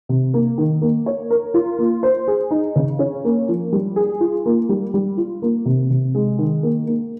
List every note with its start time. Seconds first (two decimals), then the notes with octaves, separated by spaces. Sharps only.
0.09 C3
0.34 A#3
0.58 D#3
0.81 A#3
1.06 C#5
1.30 A#4
1.54 F4
1.79 A#3
2.03 C5
2.28 G#4
2.51 D#4
2.76 C#3
2.99 C#4
3.25 A#3
3.49 F3
3.72 G3
3.96 G#4
4.21 F4
4.46 A#3
4.69 G3
4.94 G3
5.17 F4
5.42 A#3
5.66 C3
5.90 C3
6.15 G#3
6.38 D#3
6.63 A#3
6.87 A#3